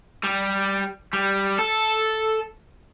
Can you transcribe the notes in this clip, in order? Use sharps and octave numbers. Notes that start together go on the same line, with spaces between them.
G3
G3
A4